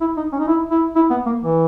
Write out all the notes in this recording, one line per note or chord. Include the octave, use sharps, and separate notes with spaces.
E4
D#4
C#4
D#4
E4
E4
E4
B3
A#3
E3